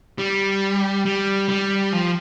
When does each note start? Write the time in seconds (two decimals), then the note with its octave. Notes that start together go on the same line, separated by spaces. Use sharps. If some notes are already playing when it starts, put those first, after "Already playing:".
0.18 G3
1.05 G3
1.49 G3
1.92 F3